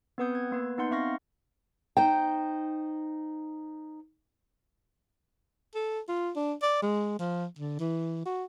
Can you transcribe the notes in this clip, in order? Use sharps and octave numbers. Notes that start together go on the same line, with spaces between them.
B3 C4 B4 F#5 D#6 G6
G#6
A#3 B3 B4
B3 D#4 F#5 C6 G6
C4 E5 F5 C#6 F6 A#6
D#4 C5 G5
A4
F4
D4
D5
G#3
F3
D3
E3
F#4